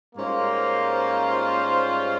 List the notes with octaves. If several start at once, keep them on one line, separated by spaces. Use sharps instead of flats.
G#2 G3 A#3 C#4 F4 C5